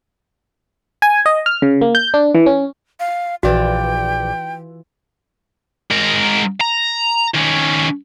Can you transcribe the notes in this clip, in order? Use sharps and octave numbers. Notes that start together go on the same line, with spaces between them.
G#5
D#5
F6
C#3
A#3
G6
D4
E3
C#4
F5
A#1 E3 F4 F#4 D5 G5
G#2 A#4
A#5
D#3 C#4